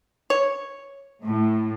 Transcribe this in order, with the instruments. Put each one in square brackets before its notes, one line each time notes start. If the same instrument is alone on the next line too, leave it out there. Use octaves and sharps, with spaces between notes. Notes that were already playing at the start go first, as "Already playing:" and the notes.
[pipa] C#5
[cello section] A2